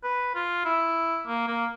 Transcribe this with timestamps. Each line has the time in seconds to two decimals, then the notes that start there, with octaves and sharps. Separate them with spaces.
0.04 B4
0.35 F4
0.65 E4
1.27 A#3
1.47 A#3